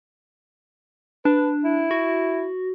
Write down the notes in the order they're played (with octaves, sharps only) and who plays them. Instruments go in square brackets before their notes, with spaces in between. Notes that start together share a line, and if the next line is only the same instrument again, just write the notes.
[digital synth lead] D4 [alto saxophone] B4
[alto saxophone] E4
[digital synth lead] F#4